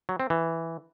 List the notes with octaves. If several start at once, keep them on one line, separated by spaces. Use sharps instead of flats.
F#3
C4
E3